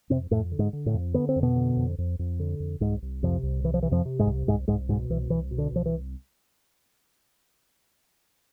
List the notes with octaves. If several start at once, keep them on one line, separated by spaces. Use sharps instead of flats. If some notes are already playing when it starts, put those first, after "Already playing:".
F2 C3 C4
F2 A2 A3
D3
G#2 G#3
D3
A2 A3
F2
D3 B3
C4
F2
B2 B3
D3
F2
F2
F2
D3
F2
C2 G#2 G#3
C2
F2 C3 F3
C2
C3 E3
F3
C3 E3
F2 F3
C3
G#2 G#3
C2
C2 G#2 G#3
C2 G#2 G#3
G#2 B2 G#3
C2 E3
C2 E3
B2
D3
C2 F3
E3